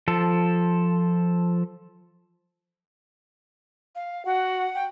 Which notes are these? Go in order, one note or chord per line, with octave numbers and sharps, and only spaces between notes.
F3 A4
F5
F#4 F#5
G5